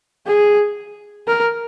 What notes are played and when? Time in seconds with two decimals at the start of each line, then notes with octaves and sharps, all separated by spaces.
0.27 G#4
1.28 A#4